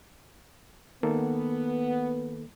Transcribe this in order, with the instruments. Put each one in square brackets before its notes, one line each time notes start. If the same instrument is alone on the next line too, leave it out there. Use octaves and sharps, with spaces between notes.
[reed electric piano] D#3 A#3 A4 [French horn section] B3